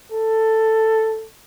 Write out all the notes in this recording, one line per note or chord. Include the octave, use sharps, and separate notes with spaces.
A4